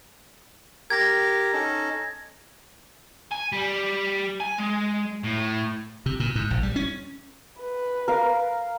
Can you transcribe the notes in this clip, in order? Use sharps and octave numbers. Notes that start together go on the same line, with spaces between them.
G4 A#4 G#6 A#6
C#4 D#4 A4
G#5
G3
G#5
G#3
A2
C3
A#2
G#2
A#1
G3
C#4
B4
A#4 F5